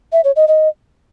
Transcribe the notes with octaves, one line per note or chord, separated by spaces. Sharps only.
E5
C#5
D#5
D#5